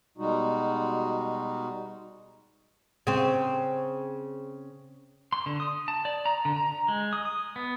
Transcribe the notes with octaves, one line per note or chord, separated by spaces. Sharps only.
B2 G3 G#3 D#4 F#4
C#3 C4
C6
D3
D#6
A5
D5
A#5
D3
A#5
G#3
D#6
D#6
B3